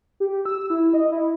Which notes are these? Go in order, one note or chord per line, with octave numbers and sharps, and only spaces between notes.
G4
E6
E4
D#5
E4